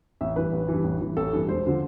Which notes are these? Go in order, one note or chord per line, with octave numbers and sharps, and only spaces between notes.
A1 E5
G2 E3 B4
A1
G2 E3
A1
G2 E3
A1 A4
G2 E3
E1 C5
D3 F3